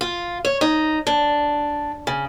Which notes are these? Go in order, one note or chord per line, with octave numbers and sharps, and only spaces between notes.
F4
C#5
D#4
D4
C#3